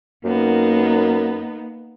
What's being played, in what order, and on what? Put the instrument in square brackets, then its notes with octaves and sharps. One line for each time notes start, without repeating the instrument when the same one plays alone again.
[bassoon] F#2 [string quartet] A#3 B3 D#4